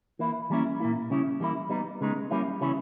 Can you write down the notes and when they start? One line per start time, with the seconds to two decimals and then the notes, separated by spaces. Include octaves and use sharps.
0.19 E3 A#3 E4
0.50 E3 G3 A#3 C#4 E4
0.80 A#2 A#3 E4
1.10 C#3 G3 C#4 E4
1.40 E3 G3 A#3 E4
1.70 G3 B3 D#4
2.01 C#3 G#3 B3 D#4
2.31 G3 A#3 C#4 E4
2.61 C#3 E3 G3 C#4 E4